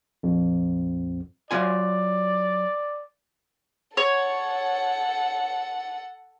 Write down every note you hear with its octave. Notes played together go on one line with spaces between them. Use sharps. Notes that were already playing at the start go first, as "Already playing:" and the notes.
A#1 F2
F#3 F4 D5 G#5
A4 C#5 F#5